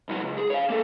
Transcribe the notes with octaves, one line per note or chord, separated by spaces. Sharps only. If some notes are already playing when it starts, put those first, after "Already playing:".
C2 F#3
C#2
G#4
C#5 F5
A#3 A4